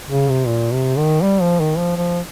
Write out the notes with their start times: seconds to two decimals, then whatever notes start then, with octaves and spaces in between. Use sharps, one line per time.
0.10 C#3
0.30 C3
0.47 A#2
0.72 C3
0.97 D#3
1.23 G3
1.42 F3
1.60 D#3
1.78 F3
1.97 F3